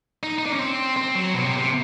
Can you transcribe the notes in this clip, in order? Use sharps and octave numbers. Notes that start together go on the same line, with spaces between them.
D#4
D#4
D4
C#4
C4
C4
F#3
B2
C3
C3